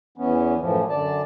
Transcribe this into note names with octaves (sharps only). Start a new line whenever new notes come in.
E2 E3 B3 C#4
F#2 A2 E3 F3
F#2 D3 D5 A5